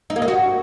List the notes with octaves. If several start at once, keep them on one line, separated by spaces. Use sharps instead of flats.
D#4
A#3
D#4
F#4